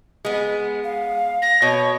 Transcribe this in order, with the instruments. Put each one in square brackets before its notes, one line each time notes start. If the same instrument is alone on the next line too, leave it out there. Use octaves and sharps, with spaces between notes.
[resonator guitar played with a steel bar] G#3 B3
[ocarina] F5
[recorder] A#6
[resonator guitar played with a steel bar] B2 [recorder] C#5 [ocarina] D#5